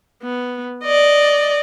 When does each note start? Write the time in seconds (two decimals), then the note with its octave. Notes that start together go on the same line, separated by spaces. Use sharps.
0.22 B3
0.84 D5 D#5